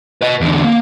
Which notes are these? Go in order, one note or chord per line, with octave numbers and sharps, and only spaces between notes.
B4 D#5
E2 D3
A#3